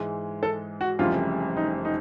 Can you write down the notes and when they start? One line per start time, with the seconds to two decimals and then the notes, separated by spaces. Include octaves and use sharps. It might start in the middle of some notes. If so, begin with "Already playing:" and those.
Already playing: G#2 E3 G#3
0.43 A4
0.81 F#4
0.99 F1 F2 C#3 E3 G3 F4
1.57 D#4
1.85 D#4